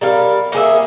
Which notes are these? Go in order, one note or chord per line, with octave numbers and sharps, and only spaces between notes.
G3 A#4 F5
A#3 G#4 E5